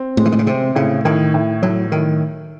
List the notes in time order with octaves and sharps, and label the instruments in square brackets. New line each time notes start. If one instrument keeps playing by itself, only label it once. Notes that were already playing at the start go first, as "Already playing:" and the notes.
Already playing: [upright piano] C4
[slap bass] A2 [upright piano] G#3
[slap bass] E3
D#3
C#3
[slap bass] C3 [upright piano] C4
[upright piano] A2 [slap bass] C#3
[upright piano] A2 [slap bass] D#3
[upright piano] A2
[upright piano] A2 [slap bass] F#3
[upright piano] A2 [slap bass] D#3